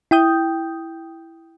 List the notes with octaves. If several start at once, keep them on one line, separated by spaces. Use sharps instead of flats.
E4 G5 D#6 G6